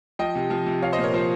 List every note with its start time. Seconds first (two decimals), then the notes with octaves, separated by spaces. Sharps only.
0.19 F3 D#5 G5
0.35 C3
0.50 F3
0.67 C3
0.82 F3 C#5 F5
0.92 C5 D#5
0.98 A#2
1.03 A#4 C#5
1.14 F3 C5